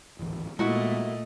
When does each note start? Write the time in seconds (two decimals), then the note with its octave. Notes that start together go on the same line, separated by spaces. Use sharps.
0.19 D1 G#1 E3
0.59 A#2 G#3 A3 B3 E4 F#4 A#4 D#5